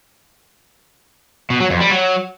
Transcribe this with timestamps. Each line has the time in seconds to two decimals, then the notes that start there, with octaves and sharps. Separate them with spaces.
1.50 B2
1.60 F#3
1.70 F2
1.80 G3
1.90 F#3